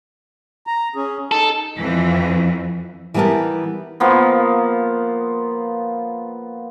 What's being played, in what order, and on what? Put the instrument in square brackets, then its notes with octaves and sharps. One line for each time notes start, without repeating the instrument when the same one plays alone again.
[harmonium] A#5
C#4 G#4
[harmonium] D#4 [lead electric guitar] A4
[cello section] F2 E3
[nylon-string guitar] E3 G3 B3 G4 A#4 A5
[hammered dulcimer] F3 A#3 B3